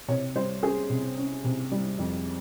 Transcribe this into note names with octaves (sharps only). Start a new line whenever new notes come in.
C3 C#5
G3 C5
C#4 G#4
C3
C#4
C3
G3
F2